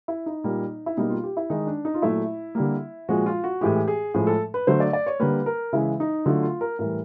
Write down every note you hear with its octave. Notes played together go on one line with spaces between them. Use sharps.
E4
D#4
A#2 G3 A#3
E4
B2 G3 A#3 D#4
F4
G4
E4
D#3 G#3 D#4
D4
D#4
F4
A#2 F#3 A3 E4
D3 G3 A#3
A#2 F3 G#3 F#4
F4
F#4
A2 E3 G#3 G4
G#4
A2 F3 G#3 G#4
A4
B4
D3 F#3 A3 C5
D5
D5
C#5
D3 G3 A#3 B4
A#4
C#3 E3 G#3 E4
D#4
D3 F#3 A3 F4
F4
A#4
A2 E3 G3 A#4